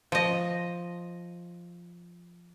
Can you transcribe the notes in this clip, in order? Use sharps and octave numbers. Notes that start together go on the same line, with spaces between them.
F3 D#5